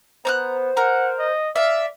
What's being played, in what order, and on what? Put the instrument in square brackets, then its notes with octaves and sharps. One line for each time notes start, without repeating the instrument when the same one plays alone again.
[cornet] B3 [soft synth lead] C5 [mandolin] A#5 D#6 F#6
[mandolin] A#4 A#5 [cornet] F#5
[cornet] D#5
[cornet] D5 [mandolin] E5 F5